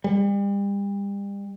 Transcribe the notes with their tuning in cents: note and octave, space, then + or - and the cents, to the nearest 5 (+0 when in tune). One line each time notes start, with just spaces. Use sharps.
G3 +35